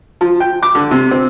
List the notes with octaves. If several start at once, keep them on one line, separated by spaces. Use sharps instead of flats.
F3
G5
D6
D3
C3
C4